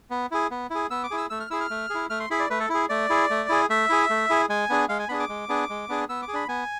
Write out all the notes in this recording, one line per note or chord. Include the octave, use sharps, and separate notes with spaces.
B3
E4 G#4
B3
E4 G#4
B3 E6
D6
E4 G#4
E6
A3 E6
F6
E4 G#4 E6
F6
A3
E4 G#4
A3 F6
C6
E4 G#4 B5
D5
A3 B4
A4
E4 G#4
A3 D5
E4 G#4
A3
E4 G#4
A3 E5
E4 G#4
A3
E4 G#4
G#3 G#5
B3 D4 G#4
G#3 F5
G#5
B3 D4 G#4 B5
D6
G#3
B3 D4 G#4
G#3
B3 D4 G#4
B3 E6
D6
G#4
D4 B5
B3 G#5